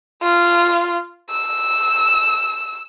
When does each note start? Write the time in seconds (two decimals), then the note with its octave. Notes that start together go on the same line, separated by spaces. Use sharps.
0.22 F4
1.31 E6